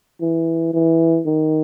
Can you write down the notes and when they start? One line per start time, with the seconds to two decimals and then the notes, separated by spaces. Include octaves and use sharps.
0.21 E3
0.74 E3
1.26 D#3